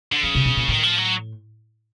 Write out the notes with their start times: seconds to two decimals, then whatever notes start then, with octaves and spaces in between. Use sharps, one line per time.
0.12 D3
0.23 C#3 F3
0.35 C3
0.45 B2
0.57 A#2
0.68 A2 D#3
0.83 F3
0.98 F#3